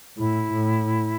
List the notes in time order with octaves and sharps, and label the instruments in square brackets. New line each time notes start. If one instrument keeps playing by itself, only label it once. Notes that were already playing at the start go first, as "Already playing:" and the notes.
[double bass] A2 [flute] E4
[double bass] A2